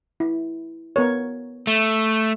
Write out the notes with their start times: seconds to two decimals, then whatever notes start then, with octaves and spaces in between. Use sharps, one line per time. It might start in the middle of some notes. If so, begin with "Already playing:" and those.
0.20 E4
0.96 B3 A#4 C#5
1.67 A3